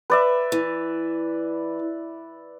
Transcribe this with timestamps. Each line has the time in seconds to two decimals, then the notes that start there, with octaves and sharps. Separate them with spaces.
0.10 B4 D5 E5
0.52 E3